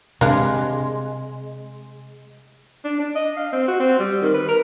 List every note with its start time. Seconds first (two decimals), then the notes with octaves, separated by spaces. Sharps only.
0.21 C3 G3 G#3 D4 F5
2.85 D4
3.00 D4
3.15 D#5
3.37 F5
3.52 C4
3.68 F#4
3.80 C4
3.99 G3
4.22 D#3
4.34 B4
4.48 A#4